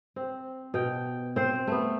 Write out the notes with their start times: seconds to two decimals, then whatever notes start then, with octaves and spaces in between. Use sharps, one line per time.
0.16 C4
0.74 B2 G5
1.36 C4 C5
1.67 A3 B3